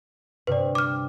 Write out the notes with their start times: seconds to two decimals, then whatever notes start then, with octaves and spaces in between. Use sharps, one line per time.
0.47 G2 C3 B4 D5
0.75 D6 F6